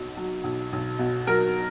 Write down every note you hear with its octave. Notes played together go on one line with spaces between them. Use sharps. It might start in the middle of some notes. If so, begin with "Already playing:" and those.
Already playing: B1 B2
F#3
B1
B1
B2
F#3 A#4